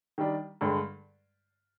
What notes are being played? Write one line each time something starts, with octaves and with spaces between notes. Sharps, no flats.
D#3 G3 D4
G2 D3 G#3